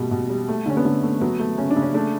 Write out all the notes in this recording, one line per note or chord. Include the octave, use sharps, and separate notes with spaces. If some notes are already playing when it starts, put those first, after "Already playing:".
Already playing: B2 G3 A3
B2
G3
A3
D3 C#4
B3
D3 A3
A3
F#3 B3
A3
C#3 C#4
D4
C#3
C#4
A3 D4